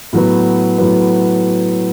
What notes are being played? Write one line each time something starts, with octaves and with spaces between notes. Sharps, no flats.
A2 F#3 B3
A2 F#3 B3